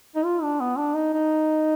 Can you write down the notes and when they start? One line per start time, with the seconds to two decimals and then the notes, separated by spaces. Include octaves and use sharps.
0.15 D#4
0.25 F4
0.43 D4
0.60 B3
0.78 D4
0.95 D#4
1.13 D#4